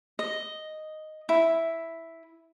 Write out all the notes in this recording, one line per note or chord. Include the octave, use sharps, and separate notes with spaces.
D#5
E4